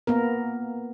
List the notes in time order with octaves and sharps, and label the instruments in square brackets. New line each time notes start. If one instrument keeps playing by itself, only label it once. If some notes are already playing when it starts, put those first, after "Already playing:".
[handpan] A#3 B3 A#4